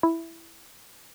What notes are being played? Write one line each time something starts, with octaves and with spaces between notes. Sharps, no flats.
E4